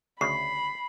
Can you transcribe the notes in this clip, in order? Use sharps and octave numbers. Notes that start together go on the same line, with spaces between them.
D2 C#3 B5 C7